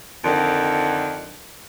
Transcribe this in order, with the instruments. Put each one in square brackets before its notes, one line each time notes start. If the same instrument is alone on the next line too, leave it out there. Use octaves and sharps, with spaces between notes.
[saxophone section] F2 D3 D#3